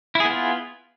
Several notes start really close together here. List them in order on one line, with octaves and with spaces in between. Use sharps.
E4 G#4 B3 F4